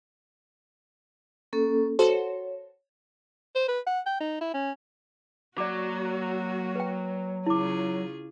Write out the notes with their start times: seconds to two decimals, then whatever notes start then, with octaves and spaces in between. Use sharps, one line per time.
1.53 A#3 C#4 A4
1.99 F#4 A4 C5 C#5
3.55 C5
3.68 B4
3.86 F#5
4.06 G5
4.20 D#4
4.41 E4
4.54 C#4
5.58 F#3 A#3 F#4 D5 D6
6.76 B4 G5
7.46 C#3 E4 F4 G#4 D6